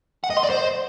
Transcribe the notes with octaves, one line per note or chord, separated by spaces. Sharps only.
F#5
D#5
C6
D5
C5